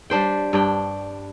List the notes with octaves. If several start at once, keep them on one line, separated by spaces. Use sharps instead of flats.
G3 D4 C5 G5
G2 D4 G5